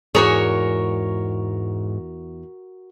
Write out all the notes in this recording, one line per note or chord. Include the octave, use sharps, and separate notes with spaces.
E2 G#2 F#4 G#4 A#4 C#5